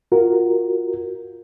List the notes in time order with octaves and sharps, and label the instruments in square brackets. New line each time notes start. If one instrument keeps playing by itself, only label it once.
[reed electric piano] F4 F#4 A#4